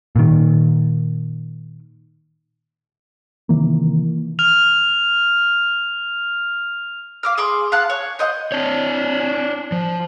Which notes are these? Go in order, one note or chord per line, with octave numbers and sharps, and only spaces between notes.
A#2 D#3
C3 D#3 E3 A#3
F6 F7
F5 D6 F6
G#4 C6 D6
F5 F#5 A5 F#6
C#5
C5 D#5 F#5
D4 C#5
F3